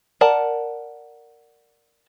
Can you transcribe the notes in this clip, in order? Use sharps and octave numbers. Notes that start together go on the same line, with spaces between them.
A#4 D5 F#5 A5